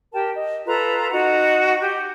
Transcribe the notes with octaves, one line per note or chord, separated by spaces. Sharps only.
G4 A#4 G5 A5
D#5
F4 A4 B4 A#5
D#4 F#4 F#5
G4